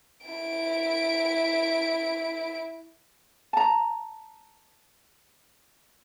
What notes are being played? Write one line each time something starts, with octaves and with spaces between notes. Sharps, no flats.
E4 D7
A5 A#5